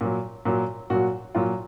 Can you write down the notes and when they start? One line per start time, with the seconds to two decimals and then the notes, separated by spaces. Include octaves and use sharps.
0.01 A#2 F#3
0.45 A#2 F#3
0.90 A#2 F#3 F#4
1.35 A#2 F#3 F4